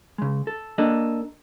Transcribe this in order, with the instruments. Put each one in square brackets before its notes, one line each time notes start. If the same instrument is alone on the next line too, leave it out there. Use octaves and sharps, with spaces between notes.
[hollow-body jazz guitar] C#3 G#3
A4
A#3 D4 A4 D#5